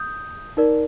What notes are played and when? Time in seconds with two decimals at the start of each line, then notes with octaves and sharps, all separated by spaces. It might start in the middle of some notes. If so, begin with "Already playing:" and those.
Already playing: D#6 G6
0.57 D#4 A#4 D5